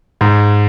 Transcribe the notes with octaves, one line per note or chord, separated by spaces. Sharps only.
G#2